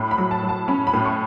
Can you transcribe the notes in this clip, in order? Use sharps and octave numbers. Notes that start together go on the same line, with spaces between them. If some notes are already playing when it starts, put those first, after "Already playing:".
Already playing: A2 B5
B5
F#3
A5
F#3
A5
C#4 B5
B5
A2
C#6